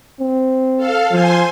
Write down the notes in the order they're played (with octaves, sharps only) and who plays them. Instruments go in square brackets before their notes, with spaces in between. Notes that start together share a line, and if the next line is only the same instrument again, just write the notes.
[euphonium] C4
[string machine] A4 F5
[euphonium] F3 [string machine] C5 G#5 C6